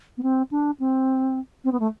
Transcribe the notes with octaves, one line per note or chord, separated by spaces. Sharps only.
B3
C4
D4
C4
C4
B3
A3